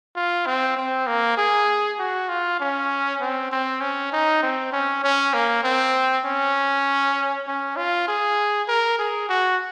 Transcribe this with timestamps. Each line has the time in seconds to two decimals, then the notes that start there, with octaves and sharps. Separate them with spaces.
0.16 F4
0.47 C4
0.77 C4
1.07 A#3
1.37 G#4
1.99 F#4
2.29 F4
2.60 C#4
3.21 C4
3.52 C4
3.81 C#4
4.12 D#4
4.43 C4
4.73 C#4
5.04 C#4
5.34 A#3
5.64 C4
6.25 C#4
7.47 C#4
7.77 F4
8.08 G#4
8.68 A#4
8.99 G#4
9.29 F#4